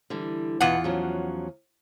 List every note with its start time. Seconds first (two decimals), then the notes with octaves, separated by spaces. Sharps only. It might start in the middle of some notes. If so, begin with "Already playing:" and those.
0.10 D3 E3 G3
0.61 E2 B2 F4 F#5
0.84 F3 F#3 C#4